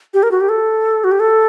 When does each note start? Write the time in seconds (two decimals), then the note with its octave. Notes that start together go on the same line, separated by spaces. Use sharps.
0.14 G4
0.23 A#4
0.32 F#4
0.41 G4
0.49 A4
1.04 F#4
1.11 G4
1.20 A4